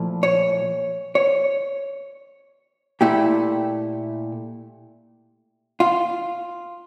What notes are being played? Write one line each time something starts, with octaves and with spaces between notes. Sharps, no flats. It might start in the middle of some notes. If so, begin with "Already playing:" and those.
Already playing: A#2 F3 A3 E4
C#5
C#5
A#2 A3 E4 G4
F4